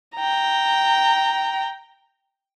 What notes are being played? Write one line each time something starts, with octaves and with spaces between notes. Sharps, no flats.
G5 A#5